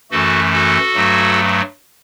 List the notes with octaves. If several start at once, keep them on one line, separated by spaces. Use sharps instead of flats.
F#2 E3 A3 F#4 A4
F#4 A4
G2 F#3 A3